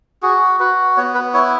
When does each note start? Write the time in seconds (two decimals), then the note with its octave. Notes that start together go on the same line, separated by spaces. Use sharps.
0.23 F#4 G#4
0.60 F#4 B4
0.97 B3 C#5
1.15 B4
1.34 E4 C#5